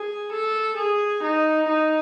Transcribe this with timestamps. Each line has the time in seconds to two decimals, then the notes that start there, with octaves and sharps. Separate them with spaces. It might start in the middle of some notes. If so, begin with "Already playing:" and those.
Already playing: G#4
0.32 A4
0.77 G#4
1.23 D#4
1.68 D#4